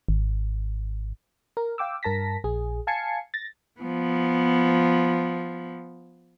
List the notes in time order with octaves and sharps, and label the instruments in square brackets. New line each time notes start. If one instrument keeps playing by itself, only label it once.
[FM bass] G#1
[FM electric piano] A#4
F5 G5 D6 E6
G2 A#4 A5 A#6 B6
A#1 G#4
F5 G#5 A5 G#6 C7 C#7
A6 A#6
[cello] F3 B3